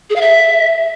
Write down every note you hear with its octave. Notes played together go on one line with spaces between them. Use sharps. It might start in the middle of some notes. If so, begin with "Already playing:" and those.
G#4
F5
E5